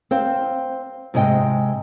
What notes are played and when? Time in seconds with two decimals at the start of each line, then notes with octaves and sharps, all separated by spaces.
0.11 C4 C5 F5 G5
1.14 G#2 C3 G#3 D#5 G5